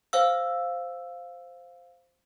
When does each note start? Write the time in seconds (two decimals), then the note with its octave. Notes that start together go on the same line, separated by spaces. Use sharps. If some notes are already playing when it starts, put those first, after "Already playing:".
0.13 C5 F5 E6